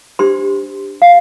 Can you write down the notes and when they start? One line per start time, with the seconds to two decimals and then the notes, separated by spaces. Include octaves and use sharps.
0.19 D4 G4 C5 C6
1.02 F5